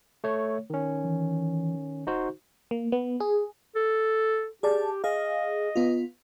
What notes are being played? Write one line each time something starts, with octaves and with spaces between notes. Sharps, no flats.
A3 C#5
D#3 C#4
E3
D1 D#4 F#4 C5
A#3
B3
G#4
A4
G4 G#4 D5 A5
G#4 D#5 F5
B3 F4